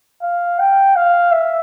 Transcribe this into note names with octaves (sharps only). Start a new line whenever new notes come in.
F5
G5
F5
E5